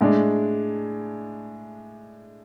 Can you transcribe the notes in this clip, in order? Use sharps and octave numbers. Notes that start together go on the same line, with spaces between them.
A2 G#3 D4